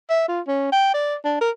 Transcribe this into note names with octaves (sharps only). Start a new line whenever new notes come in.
E5
F4
C#4
G5
D5
D4
A#4